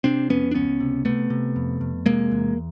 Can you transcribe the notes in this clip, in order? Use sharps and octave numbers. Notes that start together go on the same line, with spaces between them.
C3 C4 D4
F2 B3 C#4
D4
C#2 B3 C#4
C3
C3 A3 B3
C3
F2
F2
C3 G#3 A#3
E2